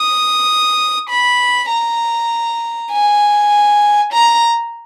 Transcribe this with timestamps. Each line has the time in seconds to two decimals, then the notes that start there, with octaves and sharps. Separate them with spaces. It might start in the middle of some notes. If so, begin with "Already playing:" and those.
Already playing: D#6
1.10 B5
1.70 A#5
2.92 G#5
4.13 A#5